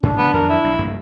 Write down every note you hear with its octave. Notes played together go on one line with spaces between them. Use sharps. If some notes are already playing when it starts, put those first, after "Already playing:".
G#2 B2 D4
C#3 E3 G#3 B3
F2 D#3 F#3 A#4
E4
B1
F1 G2 A#3